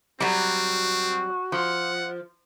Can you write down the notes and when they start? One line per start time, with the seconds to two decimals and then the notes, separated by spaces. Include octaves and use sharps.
0.20 F#3 G3 C4 F#4
1.52 F3 F#5